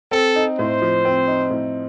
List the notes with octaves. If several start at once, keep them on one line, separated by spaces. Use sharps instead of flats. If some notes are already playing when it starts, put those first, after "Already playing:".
C4 A4
D#4
A2 C5
F3
C4
D#4
A2